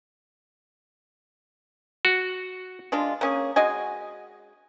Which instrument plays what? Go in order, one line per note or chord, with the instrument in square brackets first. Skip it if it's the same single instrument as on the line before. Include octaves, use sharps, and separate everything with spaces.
[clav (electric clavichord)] F#4
[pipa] G#3 D4 F4
A#3 C#4 G#4
G#3 F#4 D#5 G#5